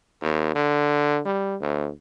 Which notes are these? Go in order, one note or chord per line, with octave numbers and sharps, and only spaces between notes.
D#2
D3
G3
D2